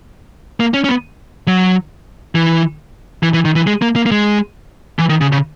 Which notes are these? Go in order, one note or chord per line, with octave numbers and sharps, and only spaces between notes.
A#3
C#4
C#4
B3
F#3
E3
E3
E3
D#3
E3
G#3
A#3
A#3
A#3
G#3
E3
D#3
C#3
C#3